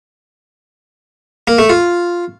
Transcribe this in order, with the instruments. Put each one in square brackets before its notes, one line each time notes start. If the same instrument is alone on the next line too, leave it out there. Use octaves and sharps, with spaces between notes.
[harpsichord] A#3
A3
F4